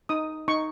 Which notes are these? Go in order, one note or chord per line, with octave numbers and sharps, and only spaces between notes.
D#4 D#6
D#4 C#6